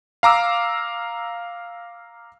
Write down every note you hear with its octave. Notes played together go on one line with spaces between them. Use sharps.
F5 A#5 D6 E6